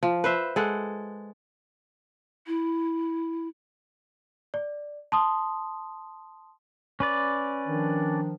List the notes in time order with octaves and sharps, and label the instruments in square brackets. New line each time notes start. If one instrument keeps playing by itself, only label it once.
[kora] F3
B4 C5 E5
G#3 A4 F#5
[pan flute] E4
[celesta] D5
A5 C6 D#6
[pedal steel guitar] C#4 B4 D5
[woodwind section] D#3 F3 D4